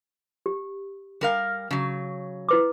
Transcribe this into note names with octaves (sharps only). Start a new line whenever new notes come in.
G4
G3 A#4 F5
C#3 F#3
E4 B4 D6